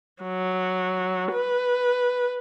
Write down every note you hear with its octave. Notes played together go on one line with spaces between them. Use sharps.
F#3
B4